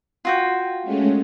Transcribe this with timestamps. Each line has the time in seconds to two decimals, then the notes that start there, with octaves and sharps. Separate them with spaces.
0.25 F4 F#4 G5
0.83 G#3 A3 C#4